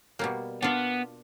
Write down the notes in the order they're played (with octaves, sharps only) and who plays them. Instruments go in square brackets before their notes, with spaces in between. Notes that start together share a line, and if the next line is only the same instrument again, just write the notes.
[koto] B2 G3 A#3
[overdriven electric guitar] B3 [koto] D4 F4